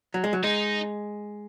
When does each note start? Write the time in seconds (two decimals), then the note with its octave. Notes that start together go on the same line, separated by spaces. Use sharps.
0.14 F#3
0.24 G#3
0.33 F#3
0.44 G#3 D#4